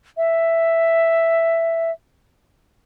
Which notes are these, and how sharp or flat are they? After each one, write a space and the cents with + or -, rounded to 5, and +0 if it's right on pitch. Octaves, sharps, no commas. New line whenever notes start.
E5 +5